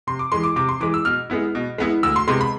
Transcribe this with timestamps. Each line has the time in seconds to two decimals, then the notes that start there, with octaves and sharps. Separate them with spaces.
0.07 C3 C6
0.19 D6
0.32 E3 G#3 C6
0.44 D6
0.56 C3 D6
0.69 C6
0.80 E3 G#3 D6
0.94 E6
1.05 B2 F6
1.30 G#3 B3 E4
1.55 B2
1.78 G#3 B3 E4
2.03 D2 E6
2.16 C6
2.28 C3 G#3 B3 C6
2.41 B5